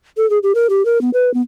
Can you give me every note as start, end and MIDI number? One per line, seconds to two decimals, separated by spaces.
0.17 0.28 69
0.30 0.38 68
0.43 0.52 67
0.55 0.67 70
0.70 0.85 67
0.85 1.01 70
1.01 1.10 59
1.14 1.32 71
1.34 1.42 59